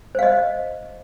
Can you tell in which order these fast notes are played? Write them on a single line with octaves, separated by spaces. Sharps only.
C5 F5 D#5